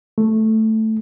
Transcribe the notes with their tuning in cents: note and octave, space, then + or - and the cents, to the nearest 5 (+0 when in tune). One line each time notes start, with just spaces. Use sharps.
A3 +0